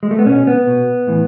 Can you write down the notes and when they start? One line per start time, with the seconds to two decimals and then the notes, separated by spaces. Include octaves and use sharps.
0.03 G#3
0.11 A3
0.19 B3
0.26 B2 C#4
0.47 B3
0.67 B2
1.07 A2 E3